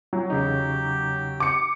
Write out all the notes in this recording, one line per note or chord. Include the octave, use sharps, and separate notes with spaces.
F#3
E2 C#3 D#4 G4
D6 C#7